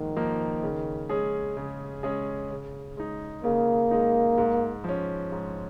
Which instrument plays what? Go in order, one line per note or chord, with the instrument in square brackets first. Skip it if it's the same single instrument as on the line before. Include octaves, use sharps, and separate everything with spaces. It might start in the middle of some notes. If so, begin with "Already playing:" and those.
Already playing: [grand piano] G#2 F3 A#3 [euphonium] D#3
[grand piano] F3 A#3 D#4 A#4
C#3
G#3 C#4 G#4
C#3
G#3 C#4 G#4
C#3
G#3 D#4
[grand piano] C#3 [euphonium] A#3
[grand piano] G#3 D#4
G#2
F3 C#4
G#2